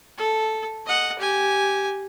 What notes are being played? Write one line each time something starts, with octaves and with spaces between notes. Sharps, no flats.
A4
D#5 F#5
G4 G#5